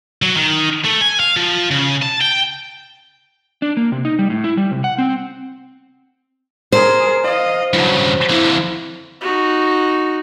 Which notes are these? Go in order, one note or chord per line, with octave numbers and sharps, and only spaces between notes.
F#3
D#3
A3
G#5
F5
F3
C#3
A5
G5
D4
A#3
C3
D#4
G3
A2
E4
G3
C3
F#5
C4
G#4 A#4 C5
D#5 F5
G2 C#3 F#3
F2 D3 E4
D#4 F#4